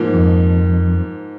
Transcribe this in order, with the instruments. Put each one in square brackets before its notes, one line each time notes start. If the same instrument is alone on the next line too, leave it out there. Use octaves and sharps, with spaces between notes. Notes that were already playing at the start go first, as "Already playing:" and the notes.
Already playing: [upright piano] G#2 F3 A#3
[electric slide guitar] F2